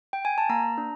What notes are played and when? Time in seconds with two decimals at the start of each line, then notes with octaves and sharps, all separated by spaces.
0.13 G5
0.25 G#5
0.38 A5
0.49 A#3 A#5
0.78 D4